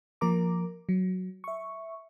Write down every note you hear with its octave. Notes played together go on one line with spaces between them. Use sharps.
F3 A#3 A#4 A#5 D6
F#3
E5 C#6